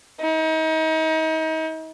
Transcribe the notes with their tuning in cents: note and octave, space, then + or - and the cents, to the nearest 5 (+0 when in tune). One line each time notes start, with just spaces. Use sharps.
D#4 +35